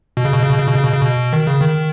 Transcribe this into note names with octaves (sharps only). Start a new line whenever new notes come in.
B2
C#3
B2
C#3
B2
C#3
B2
C#3
B2
C#3
B2
D#3
C#3
D#3